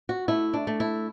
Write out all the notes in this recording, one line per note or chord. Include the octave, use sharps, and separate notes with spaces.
F#4
A3 E4
D4
A3
E4